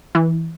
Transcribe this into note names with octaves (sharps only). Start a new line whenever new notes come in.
E3